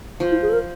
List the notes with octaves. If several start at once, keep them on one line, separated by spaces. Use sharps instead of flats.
F3
E4
G#4
A4
A#4